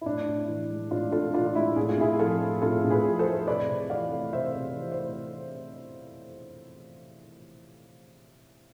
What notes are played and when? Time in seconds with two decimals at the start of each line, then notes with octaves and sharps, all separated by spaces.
0.01 E4
0.06 A2 D4
0.28 A2
0.48 E3
0.70 G#3
0.91 A2 D4 F4
1.12 A2 F4 A4
1.34 E3 D4 F4
1.47 F4
1.55 G#3 E4
1.76 A2 G#4
1.89 F4
1.98 A2 E4 G#4
2.19 F3 F4 A4
2.41 A3
2.62 A2 F4 A4
2.84 A2
2.90 G#4 B4
3.06 F3
3.19 A4 C5
3.26 A3
3.47 C3 B4 D5
3.69 C3
3.90 E3 D5 F5
4.12 A3
4.33 C3 C5 E5
4.55 C3
4.76 E3
4.92 C5
4.97 A3